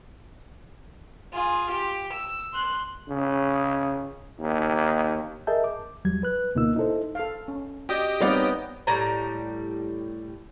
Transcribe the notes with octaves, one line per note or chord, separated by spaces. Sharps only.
F4 G#4
G4
E6
C6 F#6
C#3
D#2
G#4 A#4 D#5 E5 A5 G6
D6
E2 F#3 G3 G#6
B4 F#6
D2 B2 A#3 D#4 F4 E6
D#4 E4 A4 C5
A4 F5
C#4
F#4 G4 D5 D#5 G5
G3 B3 C4 D#4 C#5 D5 F5
A2 G3 A#5